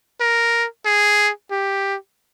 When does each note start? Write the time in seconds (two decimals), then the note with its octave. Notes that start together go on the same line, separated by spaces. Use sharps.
0.21 A#4
0.85 G#4
1.51 G4